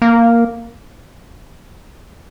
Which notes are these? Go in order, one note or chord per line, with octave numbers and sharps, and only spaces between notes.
A#3